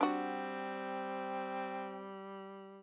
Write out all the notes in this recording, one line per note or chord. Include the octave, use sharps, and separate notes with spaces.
G3 C4 D4 F#4